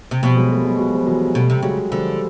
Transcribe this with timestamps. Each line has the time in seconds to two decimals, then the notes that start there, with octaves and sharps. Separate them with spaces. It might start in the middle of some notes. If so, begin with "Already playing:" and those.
0.11 C3
0.22 B2 F3 G3
0.36 F#3 G#3
0.50 G3 A3
0.65 F#3 G#3
0.79 F#3 G#3
0.94 F3 G3
1.07 E3 F#3
1.34 B2 G3 A3
1.50 C3
1.62 C#3 F#3 G#3
1.91 D3 F3 G3